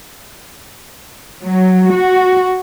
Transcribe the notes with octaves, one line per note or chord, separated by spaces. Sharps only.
F#3
F#4